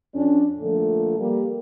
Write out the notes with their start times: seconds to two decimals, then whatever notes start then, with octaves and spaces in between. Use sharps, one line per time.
0.14 F2 C#4 D4
0.60 A#2 D3 F3 A3 A4
1.19 G3 A#3